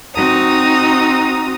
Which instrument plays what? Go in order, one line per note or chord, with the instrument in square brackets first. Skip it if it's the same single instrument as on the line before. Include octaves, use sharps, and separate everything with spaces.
[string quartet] C4 D#4 F#4 A#5 D#6